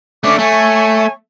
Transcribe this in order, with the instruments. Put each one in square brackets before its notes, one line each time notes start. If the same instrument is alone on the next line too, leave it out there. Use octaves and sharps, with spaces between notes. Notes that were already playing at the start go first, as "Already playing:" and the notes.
[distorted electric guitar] A3 D4 [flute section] C#4 D6
[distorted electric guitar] A3 [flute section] C#5 G#5 C#6